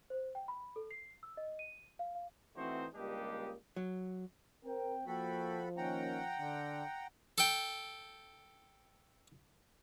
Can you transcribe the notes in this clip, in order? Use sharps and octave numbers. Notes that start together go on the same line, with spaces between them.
C5
G5
B5
A4
C7
E6
D#5
D#7
F5
F5
E3 A3 C4 D#4 F#4 C5
C#2 G3 A#3 D4 G4 D#5
F#3
C4 A#4 G5
F3 A#3 F#4 A4 G5 B5
D#3 A#3 C#4 F#5 G5 A#5
D3
A4 G5